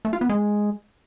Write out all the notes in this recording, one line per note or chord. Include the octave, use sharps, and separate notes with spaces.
A3
F4
B3
G#3